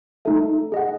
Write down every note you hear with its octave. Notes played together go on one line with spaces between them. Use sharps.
A3 D#4 A4 E5
G#4 D#5 F#5